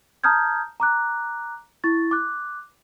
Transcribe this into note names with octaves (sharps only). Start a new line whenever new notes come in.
A5 A#5 D#6 F6 G6 G#6
A#5 D6 F#6
E4 C#6 A6
D6 F#6